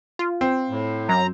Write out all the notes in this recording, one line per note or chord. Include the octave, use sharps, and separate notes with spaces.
F4
C4
A2
F#2 A#5